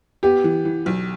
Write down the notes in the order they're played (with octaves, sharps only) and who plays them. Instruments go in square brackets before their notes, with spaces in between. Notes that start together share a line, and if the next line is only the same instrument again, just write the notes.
[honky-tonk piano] B3 [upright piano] G4
[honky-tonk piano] E3
E3
B1